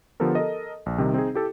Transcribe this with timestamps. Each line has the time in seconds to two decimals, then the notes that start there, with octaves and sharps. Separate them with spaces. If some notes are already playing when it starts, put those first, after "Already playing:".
0.20 D3 F3 B3 G4 A4 A#4
0.35 A4 A#4 D#5
0.86 A#1
0.98 C3 D#3 G3 C4 D#4
1.14 C4 D#4 G#4
1.34 E4 G4 A4